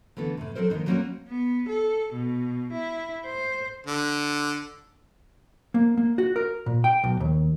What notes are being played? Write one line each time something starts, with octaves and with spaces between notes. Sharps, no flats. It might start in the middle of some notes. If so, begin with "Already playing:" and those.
D3 E3 A3 B3 A4
A2 C3
F#3 C4 A4 A#4 C5
D3 D#3 A#3 C4 D#4
F#3 G3 A#3 C4 C#4 F#4
B3
A4
B2
E4
C5
D3
A#3
A#3
F#4
A#4
A#2
G5
B1
D#2